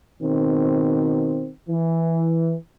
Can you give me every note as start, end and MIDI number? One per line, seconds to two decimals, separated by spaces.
0.23 1.50 47
0.23 1.50 51
0.23 1.50 60
1.70 2.54 52